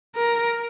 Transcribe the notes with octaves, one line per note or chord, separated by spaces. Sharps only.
A#4